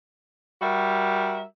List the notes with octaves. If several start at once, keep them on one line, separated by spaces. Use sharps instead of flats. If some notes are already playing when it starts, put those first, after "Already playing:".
G3 F#4 A#4 E5